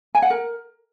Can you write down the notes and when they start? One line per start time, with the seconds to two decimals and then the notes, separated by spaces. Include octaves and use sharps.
0.15 G#5
0.22 F#5
0.30 A#4